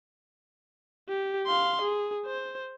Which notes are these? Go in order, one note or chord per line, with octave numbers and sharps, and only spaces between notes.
G4
F5 C6
G#4
C5